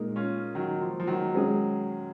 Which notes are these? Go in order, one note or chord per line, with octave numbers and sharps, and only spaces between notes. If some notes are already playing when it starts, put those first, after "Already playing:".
Already playing: A#2 G#3 D#4 A#4
C#4 F4
D#3 F#3
F3
F3
D#3 F#3
G#3 C#4 G#4